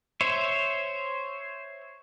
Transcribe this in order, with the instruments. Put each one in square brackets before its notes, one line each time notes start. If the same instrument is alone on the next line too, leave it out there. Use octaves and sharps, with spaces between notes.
[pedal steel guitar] C5 C#5 E5